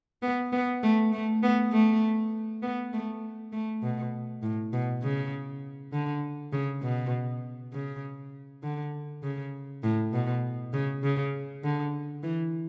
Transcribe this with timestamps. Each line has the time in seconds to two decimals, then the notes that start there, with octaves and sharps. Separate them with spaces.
0.23 B3
0.53 B3
0.83 A3
1.12 A3
1.43 B3
1.72 A3
2.63 B3
2.93 A3
3.53 A3
3.83 B2
4.43 A2
4.73 B2
5.03 C#3
5.93 D3
6.53 C#3
6.83 B2
7.73 C#3
8.63 D3
9.23 C#3
9.83 A2
10.13 B2
10.73 C#3
11.03 C#3
11.64 D3
12.23 E3